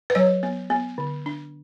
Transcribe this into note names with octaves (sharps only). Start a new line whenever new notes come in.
B4
F#3 C#5
B3
B3
D3
D4